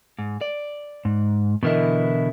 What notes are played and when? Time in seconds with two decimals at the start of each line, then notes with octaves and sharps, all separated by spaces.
0.18 G#2
0.41 D5
1.05 G#2
1.63 B2 D3 E3 E4 A#4 D#5